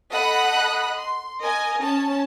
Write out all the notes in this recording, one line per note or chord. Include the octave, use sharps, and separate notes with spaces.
A4 D#5 F#5 B5 D#6 F#6
C6
A#4 D#5 G#5
C#4 A5